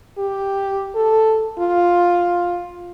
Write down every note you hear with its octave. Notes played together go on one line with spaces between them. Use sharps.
G4
A4
F4